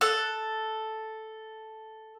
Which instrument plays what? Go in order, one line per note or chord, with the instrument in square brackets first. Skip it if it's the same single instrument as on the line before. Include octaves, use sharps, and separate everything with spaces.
[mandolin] A4 F#6